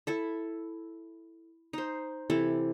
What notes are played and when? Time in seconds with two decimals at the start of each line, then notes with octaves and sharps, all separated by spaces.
0.07 E4 A4 E5
1.73 D#4 C5
2.30 C3 E3 E4 A4